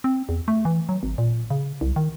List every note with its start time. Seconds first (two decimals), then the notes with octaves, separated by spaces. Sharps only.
0.04 C4
0.29 E2
0.48 A3
0.65 E3
0.89 F#3
1.03 G#1
1.18 A#2
1.50 C#3
1.81 C2
1.96 D#3